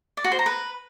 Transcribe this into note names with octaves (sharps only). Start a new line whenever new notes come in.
D5
F#4
C5
A#5
B4